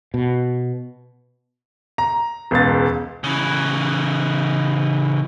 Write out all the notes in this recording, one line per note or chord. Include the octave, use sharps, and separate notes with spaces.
B2
A#5
E1 C#2 A6
C#3 E3